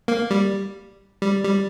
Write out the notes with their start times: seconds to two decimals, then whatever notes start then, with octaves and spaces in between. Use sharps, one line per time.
0.08 A#3
0.31 G3
1.22 G3
1.45 G3